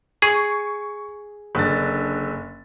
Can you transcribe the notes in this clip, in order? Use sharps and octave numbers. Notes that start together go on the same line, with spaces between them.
G#4 C#6
F#1 D3 A6